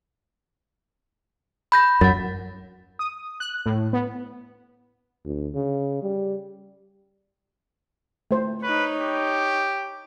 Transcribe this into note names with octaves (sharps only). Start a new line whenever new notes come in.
B5 G6 A#6
F#2 F#5 A6
D#6
F#6
A2
B3
D2
C#3
G3
A3 C5
D#4 B4 C#5
G4